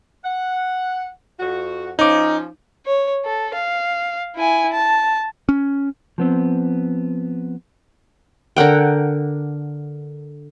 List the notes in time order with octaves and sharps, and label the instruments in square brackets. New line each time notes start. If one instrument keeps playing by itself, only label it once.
[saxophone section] F#5
F2 F#4
[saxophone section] F3 C#4 [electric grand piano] D#4 D6
[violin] C#5
A4
F5
E4 G#5
A5
[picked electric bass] C#4
[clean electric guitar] F3 B3 C4
[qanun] D3 A#4 F#5 G5